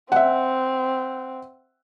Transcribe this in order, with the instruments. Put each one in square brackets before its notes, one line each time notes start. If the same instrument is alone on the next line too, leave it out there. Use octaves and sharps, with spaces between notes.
[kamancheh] C4 [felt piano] E5 F#5